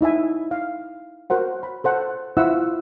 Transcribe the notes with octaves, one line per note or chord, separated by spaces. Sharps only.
D#4 E4 E5 G#5
F5
F#4 A#4 C5 F#5
B5
A4 C5 F#5
E4 F4 C5 E5 F#5 E6